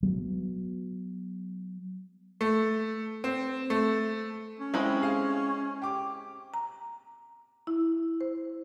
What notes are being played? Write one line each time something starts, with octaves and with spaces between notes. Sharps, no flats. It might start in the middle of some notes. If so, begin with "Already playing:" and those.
F#3 B3
A3
C4
A3
C#4
G#3 C4 E4 G5 B5
G#4 F5
G4 D6
A#5
E4
C5